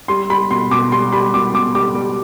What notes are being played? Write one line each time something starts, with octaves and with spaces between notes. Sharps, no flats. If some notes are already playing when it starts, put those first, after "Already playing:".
G3 C6
G3 B5
B2 C6
B2 D6
G3 C6
G3 B5
B2 D6
B2 D6
G3 D6
G3